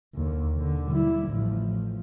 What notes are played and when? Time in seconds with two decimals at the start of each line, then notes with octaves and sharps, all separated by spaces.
0.15 D#2 D3
0.56 D3
0.91 G3 E4
1.28 A1 F3